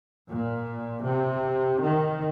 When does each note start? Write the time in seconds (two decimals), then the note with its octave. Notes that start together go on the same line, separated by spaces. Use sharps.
0.27 A#2
1.04 C3
1.81 D#3